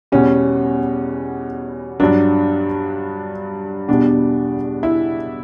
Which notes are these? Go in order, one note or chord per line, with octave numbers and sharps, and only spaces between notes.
E2 B2 G3 C#4
G2 F#3 D4
E2 B2 G3 D4
E4